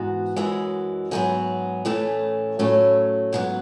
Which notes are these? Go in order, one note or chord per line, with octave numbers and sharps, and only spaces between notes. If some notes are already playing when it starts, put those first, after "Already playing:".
Already playing: G#2 E3 B3 F#4
F#2 E3 G#3
G#2 F#3 B3 G#4
A2 E3 A3 C#4
A2 F#3 A3 C#4
G#2 F#3 B3